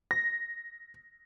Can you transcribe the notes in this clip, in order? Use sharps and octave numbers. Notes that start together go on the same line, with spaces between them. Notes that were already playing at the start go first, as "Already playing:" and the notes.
A#6